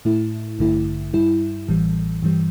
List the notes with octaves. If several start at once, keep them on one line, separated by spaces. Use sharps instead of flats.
A2 A3 E4
A1 G2 D3 A3 E4
G2 G3 E4
A1 A2 E3 G3
G2 E3 G3